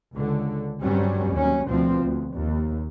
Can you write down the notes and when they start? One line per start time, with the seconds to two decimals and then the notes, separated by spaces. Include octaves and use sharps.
0.14 C#2 D3
0.82 G2 F#3 G3 C4 C#4
1.32 D#2 F#3 C#4
1.67 D2 B2 F3 C4
2.03 D2
2.34 D#2